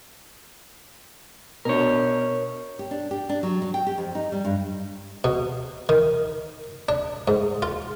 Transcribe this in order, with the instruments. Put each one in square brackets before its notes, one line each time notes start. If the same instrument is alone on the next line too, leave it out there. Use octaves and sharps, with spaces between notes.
[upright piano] B2 D4 [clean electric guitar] A#4 C#5
[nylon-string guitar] G4
D4
G4
D4
F#3
F#3
G5
G4
F2
D#4
G3
G2
[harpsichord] B2
D#3
D4
G#2
F4